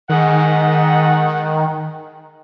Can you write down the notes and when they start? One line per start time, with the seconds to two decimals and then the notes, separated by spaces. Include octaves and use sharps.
0.09 G#2 D#3 D#4 F#5